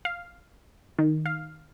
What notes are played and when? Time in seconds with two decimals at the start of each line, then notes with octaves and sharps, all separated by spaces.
0.05 F5
0.99 D#3
1.26 F5